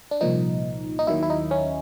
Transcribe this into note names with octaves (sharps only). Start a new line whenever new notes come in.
D4
C2 A#2 F3 D#4
D#4
D#2 D#3 F#3 E4
E4
D#4
C#4